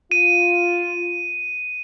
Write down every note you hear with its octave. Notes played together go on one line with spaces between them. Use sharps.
F4 D#7